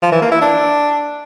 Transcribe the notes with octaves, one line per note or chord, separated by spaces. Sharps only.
F3
E3
A#3
E4
D4